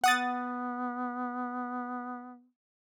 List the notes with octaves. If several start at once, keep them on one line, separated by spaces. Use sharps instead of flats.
B3 F#5 D#6 A6